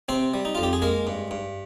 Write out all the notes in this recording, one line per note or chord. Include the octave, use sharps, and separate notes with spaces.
C3 C4 C5
G3
D#4
F2 F4
G4
G#4
G#3 A#3 A#4
G2
G2